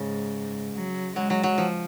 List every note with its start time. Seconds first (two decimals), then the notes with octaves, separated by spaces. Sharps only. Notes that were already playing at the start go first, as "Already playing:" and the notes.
Already playing: G#2 C#3
0.74 F#3
1.16 F#3 G#3
1.30 F#3
1.43 F#3
1.58 F3